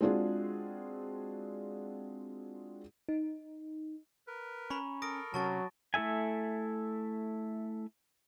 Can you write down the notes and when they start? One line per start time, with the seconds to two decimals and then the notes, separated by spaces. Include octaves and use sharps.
0.01 G#3 C4 D4 F4 F#4 G#4
3.09 D#4
4.27 A#4 B4
4.70 C#4 A#5 B5 C#6
5.02 A4 A#4 D#6 A#6 D7
5.34 C3 F#3 C#4 A5 C#6 A6
5.94 A3 E4 A4 E5 G#5